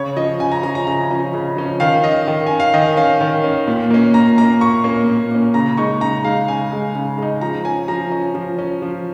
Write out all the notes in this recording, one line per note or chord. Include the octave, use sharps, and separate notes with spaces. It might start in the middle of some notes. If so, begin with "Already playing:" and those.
Already playing: C#3 C#5
F3 C#4 D#5
C#3 G#5
A#5
F3 C#4 A#5
A#5
C#3 A#5
F3 C#4
C#3
F3 C#4
D#3 F5
C#4 D#5
D#3
C#4 G#5
F5
D#3 D#5
C#4 F5
D#3
C#4
A#2
A#3 C#4
A#2 A#5
A#3 C#4 A#5
A#2 C#6
A#3 C#4
A#2
A#3 C#4
C#3 A#5
G#3 D#4 C#6
C#3 A#5
G#3 D#4 F5
C#3 G#5
G#3 D#4
C#3
G#3 D#4
F3 A#5
C#4 G#5
F3 A#5
C#4
F3
C#4
F3